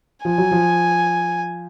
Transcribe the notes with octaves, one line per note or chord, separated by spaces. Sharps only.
F3 G#5
F#3
F3